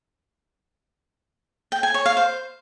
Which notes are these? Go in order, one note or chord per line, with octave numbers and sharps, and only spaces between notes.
G5
G#5
C#5
F5
C5